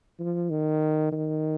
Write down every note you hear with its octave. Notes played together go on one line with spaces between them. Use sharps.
F3
D#3
D#3